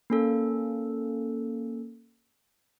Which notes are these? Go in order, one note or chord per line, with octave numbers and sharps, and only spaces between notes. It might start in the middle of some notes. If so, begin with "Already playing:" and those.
A#3 C#4 A4